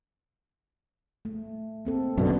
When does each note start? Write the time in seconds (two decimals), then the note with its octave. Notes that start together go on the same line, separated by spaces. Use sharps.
1.25 A3
1.85 A#3 C4 A4
2.17 F#2 B2 D3